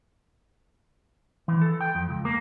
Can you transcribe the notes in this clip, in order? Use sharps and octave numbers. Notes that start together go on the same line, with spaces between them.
E3
A4
G5
F2
C#2
A#3